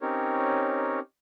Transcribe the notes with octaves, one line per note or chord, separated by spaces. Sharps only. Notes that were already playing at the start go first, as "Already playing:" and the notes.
C4 C#4 D#4 G4 A#4 C#5